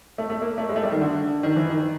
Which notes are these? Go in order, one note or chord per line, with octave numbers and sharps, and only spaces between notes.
A3
A3
A#3
A3
G#3
A3
G3
D#3
D3
D#3
E3
D#3